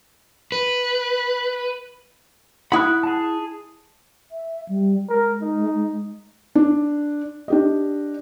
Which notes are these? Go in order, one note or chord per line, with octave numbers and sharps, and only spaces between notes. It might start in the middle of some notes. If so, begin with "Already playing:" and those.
B4
E4 F#5 B5 D#6 F#6
G#4 A5
E5
G3
G#3 A#4
D#4
D4
D4 G4 D#5